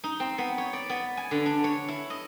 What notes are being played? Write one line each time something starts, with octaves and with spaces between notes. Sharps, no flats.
D#4
C4
B3
C#5
D5
B3
G#5
D3
D4
C#5
E4
D#5